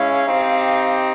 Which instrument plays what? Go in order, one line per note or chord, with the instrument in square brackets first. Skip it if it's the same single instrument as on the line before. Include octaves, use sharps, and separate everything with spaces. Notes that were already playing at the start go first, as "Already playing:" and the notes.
Already playing: [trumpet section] G#3 C#4 E4 F5
C4 D#4 G4